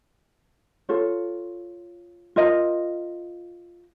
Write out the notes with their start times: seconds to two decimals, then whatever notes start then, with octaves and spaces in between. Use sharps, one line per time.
0.89 F4 A4 C#5
2.36 F4 A#4 D#5